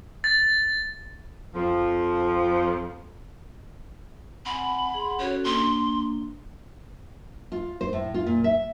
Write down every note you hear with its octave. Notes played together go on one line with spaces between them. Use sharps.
A6
F2 F3
C4 F#5 G#5 B5
G#4 F#5 C6
C#4 F#4 A4 C#5
A#3 D4 C6
F4
C5
A2
F4
A#2
E5